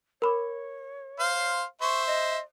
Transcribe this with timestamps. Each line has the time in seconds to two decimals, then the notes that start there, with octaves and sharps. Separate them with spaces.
0.22 A#4 C#5 B5 D6
1.19 C5 F5
1.81 C5 E5 C#6
2.07 D#5